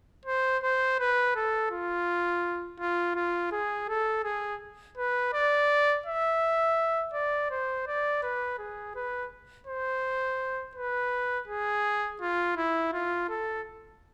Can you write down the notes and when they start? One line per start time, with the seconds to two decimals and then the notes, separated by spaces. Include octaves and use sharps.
0.26 C5
0.63 C5
0.99 B4
1.36 A4
1.71 F4
2.80 F4
3.16 F4
3.52 G#4
3.89 A4
4.24 G#4
4.98 B4
5.33 D5
6.06 E5
7.14 D5
7.51 C5
7.87 D5
8.23 B4
8.59 G#4
8.96 B4
9.67 C5
10.76 B4
11.48 G#4
12.21 F4
12.57 E4
12.93 F4
13.29 A4